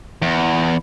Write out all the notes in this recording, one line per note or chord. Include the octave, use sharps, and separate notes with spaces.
E2